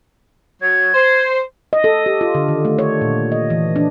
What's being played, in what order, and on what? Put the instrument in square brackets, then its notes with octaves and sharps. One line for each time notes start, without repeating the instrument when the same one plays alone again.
[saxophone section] F#3 [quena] G#6
[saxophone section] C5
[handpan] D#5
A4
G4
F4
D3
D#3
A3
C#5
A#2
D#5
E3
D4